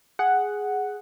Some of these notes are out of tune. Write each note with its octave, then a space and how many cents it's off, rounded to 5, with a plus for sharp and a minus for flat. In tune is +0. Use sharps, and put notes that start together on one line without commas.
G#4 +0 F#5 +0